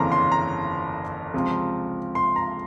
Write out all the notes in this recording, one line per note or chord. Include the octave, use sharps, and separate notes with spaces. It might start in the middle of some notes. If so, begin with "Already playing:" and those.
Already playing: G1 F2 C#3 E3 A#3 A#5 C6
C6
A#5
C#2 C3 F3 C4
C6
A#5